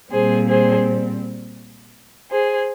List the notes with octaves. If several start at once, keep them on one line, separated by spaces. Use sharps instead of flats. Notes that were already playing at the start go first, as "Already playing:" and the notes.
A#2 G3 C4 G#4 C5
G#4 C5
G#4 C5